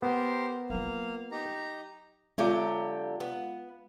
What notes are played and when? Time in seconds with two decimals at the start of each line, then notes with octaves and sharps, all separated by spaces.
0.02 B3 G4 A#4 C5
0.70 F#3 A#3 F4 F5
1.32 D#4 G4 A#5
2.38 D3 F#3 G#3 F4 G4 F5
3.20 B3